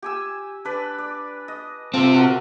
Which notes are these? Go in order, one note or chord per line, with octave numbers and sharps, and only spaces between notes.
G4 G#5 E6
D4 B4 D5
D5
D#5
C3 C4 F4 A4
F#4 A4 A#4